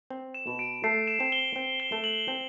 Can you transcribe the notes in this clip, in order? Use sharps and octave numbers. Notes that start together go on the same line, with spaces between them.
C4
E7
B2
D7
A3 C7
E7
C4
G7
C4
G7
A3
F#7
C4